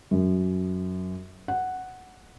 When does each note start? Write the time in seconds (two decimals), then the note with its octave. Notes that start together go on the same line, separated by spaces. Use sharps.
0.11 F#2
1.48 F#5